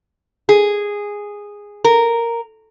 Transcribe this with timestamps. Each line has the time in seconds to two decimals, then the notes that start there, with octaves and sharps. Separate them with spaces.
0.49 G#4
1.84 A#4